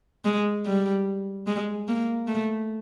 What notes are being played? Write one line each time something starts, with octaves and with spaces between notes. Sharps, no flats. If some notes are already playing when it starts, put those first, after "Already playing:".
G#3
G3
G#3
A#3
A3